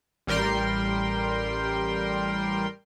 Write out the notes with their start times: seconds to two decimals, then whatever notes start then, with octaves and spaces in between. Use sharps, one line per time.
0.27 A1 G3 A#4 G5 C6